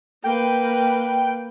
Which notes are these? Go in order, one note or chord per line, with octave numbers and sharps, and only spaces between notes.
A#3 B4 G5